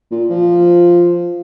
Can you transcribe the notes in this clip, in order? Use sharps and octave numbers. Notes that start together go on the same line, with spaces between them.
A#2
F3